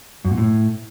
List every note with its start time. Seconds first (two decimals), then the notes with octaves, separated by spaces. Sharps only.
0.25 F#2
0.31 A#2
0.38 A2